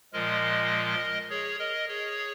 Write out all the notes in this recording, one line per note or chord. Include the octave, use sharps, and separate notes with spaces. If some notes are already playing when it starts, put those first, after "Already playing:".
A#2 F3 G#3 A#4 D#5
G#4 C#5
A#4 D#5
G#4 C#5